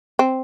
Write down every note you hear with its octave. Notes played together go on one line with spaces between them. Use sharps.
C4